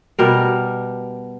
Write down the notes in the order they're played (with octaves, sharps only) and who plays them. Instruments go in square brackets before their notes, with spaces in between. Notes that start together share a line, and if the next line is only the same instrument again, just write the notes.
[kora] B2 G3 A#4